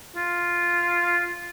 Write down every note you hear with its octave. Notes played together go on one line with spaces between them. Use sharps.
F4